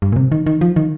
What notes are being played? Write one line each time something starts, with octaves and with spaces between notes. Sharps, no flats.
G2
A#2
C3
D#3
D#3
F3
D#3